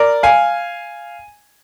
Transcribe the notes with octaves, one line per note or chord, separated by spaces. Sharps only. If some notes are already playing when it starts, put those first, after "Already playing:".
Already playing: A#4 D5
F5 G#5